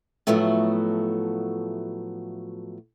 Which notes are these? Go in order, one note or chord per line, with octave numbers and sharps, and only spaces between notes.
A2 F3 F#3 A3 B3 F#4